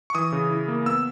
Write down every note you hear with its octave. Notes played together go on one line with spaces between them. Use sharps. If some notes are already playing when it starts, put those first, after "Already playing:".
C#6
E3 D#6
C#3
E4
A#3
B3 E6